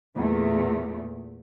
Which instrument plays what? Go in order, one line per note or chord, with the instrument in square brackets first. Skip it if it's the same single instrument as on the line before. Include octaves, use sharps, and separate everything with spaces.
[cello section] E2 A#2 A3